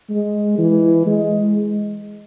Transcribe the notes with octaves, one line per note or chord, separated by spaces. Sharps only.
G#3
E3
G#3